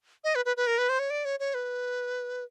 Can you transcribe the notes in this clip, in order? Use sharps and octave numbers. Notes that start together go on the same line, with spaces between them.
D#5
B4
B4
B4
A#4
B4
C5
C#5
D5
C#5
C#5
B4